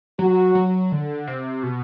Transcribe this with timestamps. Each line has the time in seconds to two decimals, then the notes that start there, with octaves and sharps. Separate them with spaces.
0.19 F#3 F#4
0.55 F#3
0.92 D3
1.27 C3
1.63 B2